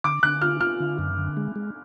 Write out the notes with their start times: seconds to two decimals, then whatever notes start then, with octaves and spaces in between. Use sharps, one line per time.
0.04 D3 D6
0.23 D3 F#6
0.41 F4 F6
0.61 F4 F6
0.80 D3
0.99 F#2
1.18 D3
1.37 G#3
1.56 G#3